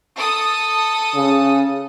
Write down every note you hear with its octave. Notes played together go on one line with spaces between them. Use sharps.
A4 D#6
C#3